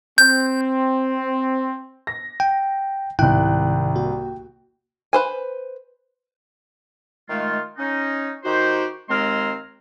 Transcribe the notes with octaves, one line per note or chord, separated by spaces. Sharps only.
C4 G6
A#6
G5
C2 G#2 D#3 E4 G5 F#6
A#3 F#4
B4 C5 G#5
D#3 G#3 A3 F4
C#4 D#4
D#3 D#4 F#4 G4 C5
D#2 G#3 C4 A#5 C6 F6